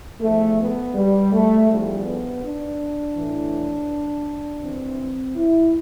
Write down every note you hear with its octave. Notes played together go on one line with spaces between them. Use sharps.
E2 D3 F3 A3
B3
G3
A3
E2 D3 F3 G3
B3
D4
A2 E3
D2 C3 E3 C4
E4